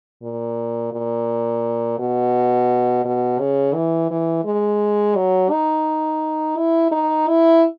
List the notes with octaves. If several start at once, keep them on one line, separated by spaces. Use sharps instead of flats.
A#2
A#2
B2
B2
C#3
E3
E3
G#3
F#3
D#4
E4
D#4
E4